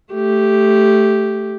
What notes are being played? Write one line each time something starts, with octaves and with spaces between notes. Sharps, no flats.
A3 G4